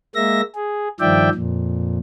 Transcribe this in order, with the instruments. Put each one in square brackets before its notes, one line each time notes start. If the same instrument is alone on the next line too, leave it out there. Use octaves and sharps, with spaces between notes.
[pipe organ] G#3 A#3 E5 A#6
G#4
G2 D#3 F3 D5 E5 G5
F2 A#2